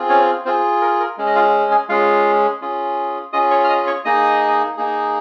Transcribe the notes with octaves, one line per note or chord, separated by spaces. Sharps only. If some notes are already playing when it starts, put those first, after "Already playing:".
Already playing: C4 F4 G#4
C#4 C#5
C4 F4 G#4 C5
A#4
A#4
G#3 C#4 G#4
D#5
F4 F5
G#4 G#5
G#3 C#4 F4 G#4 F5
C#4 F4 G#4
C#4 F4 G#4 D#5 D#6
C#5 C#6
F6
D#5 D#6
C#5 C#6
A#3 D#4 G#4 D#5 D#6
A#3 D#4 G#4